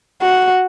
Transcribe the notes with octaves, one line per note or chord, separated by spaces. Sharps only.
F#4